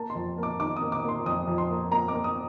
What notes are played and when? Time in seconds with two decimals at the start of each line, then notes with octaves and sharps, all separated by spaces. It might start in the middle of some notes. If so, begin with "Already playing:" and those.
Already playing: A#3 A5
0.10 C6
0.15 F2
0.38 A#3
0.43 D6
0.60 D#3 D6
0.76 D#6
0.82 A#3
0.92 D6
1.04 A#3 C6
1.26 F2 D#6
1.47 F2
1.58 C6
1.70 A#3
1.91 A#3 A#5
2.08 D6
2.14 A#3
2.24 D#6